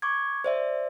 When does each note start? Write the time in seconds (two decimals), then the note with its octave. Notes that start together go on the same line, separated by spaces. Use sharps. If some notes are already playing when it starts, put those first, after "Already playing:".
0.02 C#6 D6 G#6
0.44 C5 D5 E5